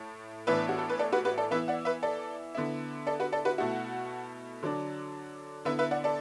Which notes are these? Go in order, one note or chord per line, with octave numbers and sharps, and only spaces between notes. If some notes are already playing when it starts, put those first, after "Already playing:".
Already playing: A2 A3
A2 E3 B3 D4 B4 E5
F#4
A4
B4
A4 D5
F#4 B4
F#4 B4
A4 D5
E3 B3 E4 B4 E5
D5 F#5
B4 E5
A4 D5
D3 B3 E4
A4 D5
F#4 B4
A4 D5
F#4 B4
B2 A3 E4 F#4
D3 F#3 D4
D3 B3 E4 B4 E5
B4 E5
D5 F#5
A4 D5